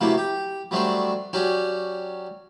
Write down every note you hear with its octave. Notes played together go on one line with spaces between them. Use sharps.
C3 F#3 A3 A#3 E4
G4
F#3 G3 A3 C4 D4
F#3 C#4 D4 G4